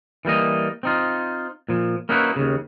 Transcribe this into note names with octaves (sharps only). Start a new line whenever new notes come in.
E3 G3 A#3 D#5
C4 D#4 F4
A#2 F3
A#3 C#4 D#4 E4 F#4 B4
D#2 C#3